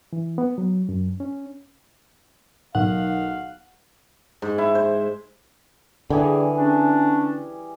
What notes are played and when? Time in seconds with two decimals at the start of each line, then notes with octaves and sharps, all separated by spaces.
0.13 E3
0.38 B3
0.58 F#3
0.89 F#2
1.20 C#4
2.75 B1 D#3 F5 F#5
4.42 G#2
4.58 E4
4.75 C5
6.10 D3 E3 G3 G#4
6.57 C#4 D4